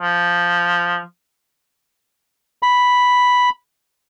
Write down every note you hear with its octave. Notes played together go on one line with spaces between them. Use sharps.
F3
B5